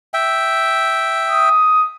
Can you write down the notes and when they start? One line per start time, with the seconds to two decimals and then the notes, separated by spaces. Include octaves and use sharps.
0.14 E5 G5
1.30 D#6